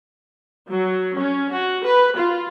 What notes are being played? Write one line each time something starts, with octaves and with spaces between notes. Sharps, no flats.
F#3
C#4
F#4
B4
F4